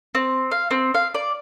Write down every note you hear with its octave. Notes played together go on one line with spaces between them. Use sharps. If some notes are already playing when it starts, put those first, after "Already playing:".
C4
F5
C4
F5
D5